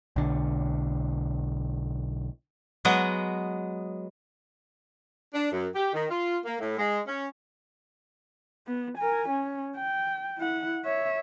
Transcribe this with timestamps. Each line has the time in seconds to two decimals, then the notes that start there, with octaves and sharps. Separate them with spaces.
0.16 B1 D3
2.85 F#3 G#3 B3 D#5
5.34 D4
5.52 F#2
5.75 G4
5.93 D#3
6.10 F4
6.45 A#3
6.60 A2
6.78 G#3
7.07 C#4
8.67 B3
8.98 A#4 G#5
9.29 C#4
9.77 G5
10.38 E4 F#5
10.85 C#5 E5